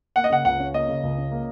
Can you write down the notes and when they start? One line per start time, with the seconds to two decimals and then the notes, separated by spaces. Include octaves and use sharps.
0.16 A#3 F#5
0.24 D#5
0.30 C#3 F#5
0.45 C#2 F#5
0.60 C#4
0.74 A#3 D#5
0.89 C#3
1.03 C#2
1.18 C#4
1.31 A#3